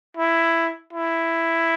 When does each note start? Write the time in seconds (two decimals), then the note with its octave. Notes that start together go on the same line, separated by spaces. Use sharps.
0.17 E4
0.93 E4